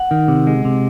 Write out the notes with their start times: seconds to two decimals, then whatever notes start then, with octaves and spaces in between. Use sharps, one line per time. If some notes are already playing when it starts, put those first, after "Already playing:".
Already playing: F#5
0.11 D#3
0.28 C3
0.47 G#3
0.65 C3